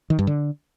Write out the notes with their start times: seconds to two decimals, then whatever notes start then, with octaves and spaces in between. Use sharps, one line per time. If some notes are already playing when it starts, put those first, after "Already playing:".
0.10 D#3
0.19 G2
0.27 D3